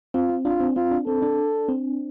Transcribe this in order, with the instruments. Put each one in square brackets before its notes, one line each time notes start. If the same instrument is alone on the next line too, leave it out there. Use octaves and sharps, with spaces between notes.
[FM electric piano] C4 [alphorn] F4
[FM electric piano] C4
[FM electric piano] D4 [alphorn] F4
[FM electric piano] C4
[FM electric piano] C4 [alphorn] F4
[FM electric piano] D4
[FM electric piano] C4 [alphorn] A4
[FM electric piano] D4
C4